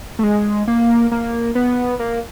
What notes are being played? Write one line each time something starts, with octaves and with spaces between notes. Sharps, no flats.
A3
G#3
A#3
A#3
B3
A#3